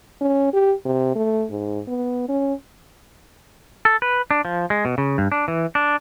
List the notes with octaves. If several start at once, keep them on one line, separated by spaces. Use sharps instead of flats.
C#4
G4
C3
A3
G#2
B3
C#4
A4
B4
D4
F3
G#3
B2
C#3
G2
D4
E3
D4